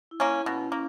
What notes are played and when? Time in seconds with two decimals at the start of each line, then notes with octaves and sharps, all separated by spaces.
0.11 E4
0.20 A#3 C#4
0.29 E4
0.46 B2 C#4
0.72 A#3 C#4